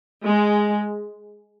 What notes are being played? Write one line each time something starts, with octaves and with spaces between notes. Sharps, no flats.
G#3